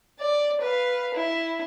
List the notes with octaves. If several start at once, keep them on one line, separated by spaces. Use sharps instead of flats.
D5
B4 F5
E4